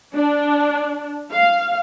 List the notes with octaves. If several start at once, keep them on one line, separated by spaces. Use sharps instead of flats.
D4
F5